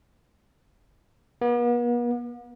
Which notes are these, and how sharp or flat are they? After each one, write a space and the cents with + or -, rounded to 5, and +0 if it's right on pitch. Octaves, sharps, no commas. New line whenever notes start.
B3 -45